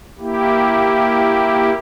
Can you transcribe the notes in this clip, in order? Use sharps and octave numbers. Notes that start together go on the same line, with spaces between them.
A#3 E4 G4